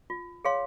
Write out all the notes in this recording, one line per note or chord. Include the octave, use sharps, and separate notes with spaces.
F4
G#4 C#5 F5 C6